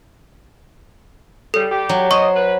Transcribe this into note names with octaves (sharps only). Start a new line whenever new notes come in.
C#3 G3 A4
G3 G4
F#3
C5 D#5 C#6
B4